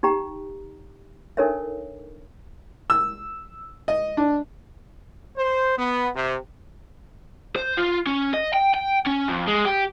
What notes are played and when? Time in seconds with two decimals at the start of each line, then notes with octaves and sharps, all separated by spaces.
0.03 D#4 G4 G5 A#5
1.37 D4 D#4 A4 A#4 C#5 E5
2.90 E6
3.88 D#5
4.17 D4
5.37 C5
5.78 B3
6.14 C3
7.56 C5
7.77 F4
8.07 C#4
8.34 D#5
8.54 G5
8.74 G5
9.07 C#4
9.28 F2
9.48 G#3
9.65 G4